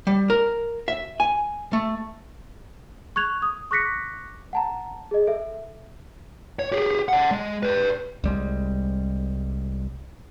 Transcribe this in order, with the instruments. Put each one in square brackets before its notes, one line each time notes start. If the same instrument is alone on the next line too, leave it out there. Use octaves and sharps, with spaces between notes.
[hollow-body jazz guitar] G3
A#4
E5
G#5
A3
[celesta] C#6 F#6 G#6 F7
D#6
C#6 D6 F#6 A#6 B6 C#7
F#5 A5 A#5
G#4 D#5
A4 E5
[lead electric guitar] C#5
G4 G#4
D5 F#5
G#3
B4 D5
[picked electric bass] C2 G3 G#3